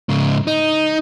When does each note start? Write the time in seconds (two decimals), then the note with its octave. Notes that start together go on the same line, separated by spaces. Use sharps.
0.09 G#2 C#3
0.47 D#4